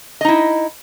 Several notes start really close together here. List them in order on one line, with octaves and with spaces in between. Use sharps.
D#5 D#4 E4